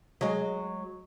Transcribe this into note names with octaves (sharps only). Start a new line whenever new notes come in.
F#3 G#3